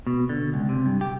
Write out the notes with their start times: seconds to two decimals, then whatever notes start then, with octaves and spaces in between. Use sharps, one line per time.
0.07 B2
0.29 D3
0.54 C#2
0.69 C3
0.86 G2
1.01 G4